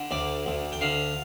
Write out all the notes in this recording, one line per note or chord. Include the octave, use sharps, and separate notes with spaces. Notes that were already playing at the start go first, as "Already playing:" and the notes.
Already playing: D3
D2 D5
D2
G5
D3 F5